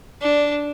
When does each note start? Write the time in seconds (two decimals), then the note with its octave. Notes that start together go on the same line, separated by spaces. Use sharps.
0.22 D4